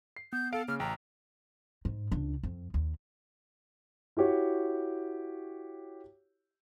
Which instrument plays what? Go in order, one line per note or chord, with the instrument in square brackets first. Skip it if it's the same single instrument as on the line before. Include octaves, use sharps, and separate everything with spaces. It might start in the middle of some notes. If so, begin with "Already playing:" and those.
[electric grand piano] C7
[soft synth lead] B3 [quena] G6
[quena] A4 [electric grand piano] F5 D7
[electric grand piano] C#3 [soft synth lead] A#3 [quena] F6
[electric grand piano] A1 [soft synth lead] G5 [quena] A#5
[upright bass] G#2
C#2 D4
F2
D#2
[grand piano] E4 F#4 G4 C#5